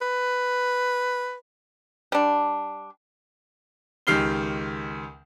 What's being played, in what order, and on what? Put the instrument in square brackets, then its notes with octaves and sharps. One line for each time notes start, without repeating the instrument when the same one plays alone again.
[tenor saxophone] B4
[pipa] G3 D4
[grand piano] C#2 D#3 G4 F6 C7 G7